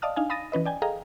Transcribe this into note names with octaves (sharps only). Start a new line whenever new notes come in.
D5 D#5 F5 A5 D#6 F6
D4 D#4 F5 G#5
F5 B5 D#6 A6 A#6 D#7
E3 C#4 B4 D#5
D5 G5 G#5
G#4 A4 D#5 F5 G5 A#5